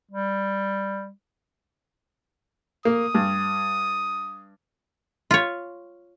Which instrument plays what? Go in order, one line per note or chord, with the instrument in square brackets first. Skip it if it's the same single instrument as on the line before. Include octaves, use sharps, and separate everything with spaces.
[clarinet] G3
[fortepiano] A#3 [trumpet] D#6
[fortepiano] G2
[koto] F4 C#5